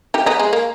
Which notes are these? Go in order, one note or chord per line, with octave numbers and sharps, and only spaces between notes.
D#4 G4
B3 D#4
G#3
A#3